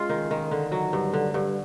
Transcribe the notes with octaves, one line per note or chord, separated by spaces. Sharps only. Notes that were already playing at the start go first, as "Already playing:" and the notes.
Already playing: G#3 C#4 F4
D#3
D#3
D3
F#3
G2
D3
G2